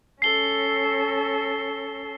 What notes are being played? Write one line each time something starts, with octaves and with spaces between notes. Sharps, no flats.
C#4 A4 C7 G7